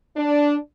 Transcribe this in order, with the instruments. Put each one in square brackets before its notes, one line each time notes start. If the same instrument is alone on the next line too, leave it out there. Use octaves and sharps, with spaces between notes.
[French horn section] D4